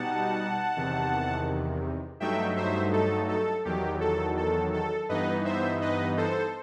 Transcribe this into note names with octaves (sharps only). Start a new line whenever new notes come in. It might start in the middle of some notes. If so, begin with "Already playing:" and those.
Already playing: B2 G3 D#4 F#5 A5
E2 C3 D#3
G2 F#3 A3 D#4 E5 G5
C5 E5
A4
A4
E2 D#3 F#3 G4
A4
A4
A4
G2 E3 B3 D#4 B4 D#5
C5 E5
B4 D#5
A4 C5